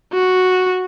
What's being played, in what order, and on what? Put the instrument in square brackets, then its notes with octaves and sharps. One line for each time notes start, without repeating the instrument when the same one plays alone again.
[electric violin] F#4